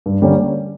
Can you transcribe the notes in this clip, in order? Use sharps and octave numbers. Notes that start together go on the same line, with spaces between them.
G2
D3 G3 A#3 C#4